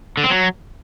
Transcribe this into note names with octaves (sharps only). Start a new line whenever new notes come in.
D3
C4
F#3